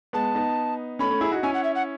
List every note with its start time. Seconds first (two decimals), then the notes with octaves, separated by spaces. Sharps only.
0.13 G#3 B3 A5
0.35 B3 D#4
0.99 A3 C#4 B5
1.10 A3 C#4
1.21 E4 G#4
1.32 D#4 F#4
1.43 C#4 E4 G#5
1.54 F#5
1.64 E5
1.75 F#5